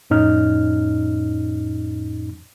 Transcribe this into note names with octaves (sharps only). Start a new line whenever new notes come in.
F2 A2 C#4 D#4 F6